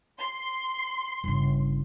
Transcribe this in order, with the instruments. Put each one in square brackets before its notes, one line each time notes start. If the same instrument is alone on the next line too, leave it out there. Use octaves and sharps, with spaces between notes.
[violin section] C6
[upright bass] G1 C#3